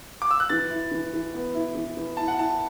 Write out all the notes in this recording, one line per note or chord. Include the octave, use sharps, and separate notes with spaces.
D6
E6
F#6
E3 A6
E4
E3
E3
B3
E4
E3
E3
E4 A5
F#5
E4 A5